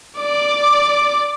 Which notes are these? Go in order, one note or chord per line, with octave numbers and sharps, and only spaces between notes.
D5 D6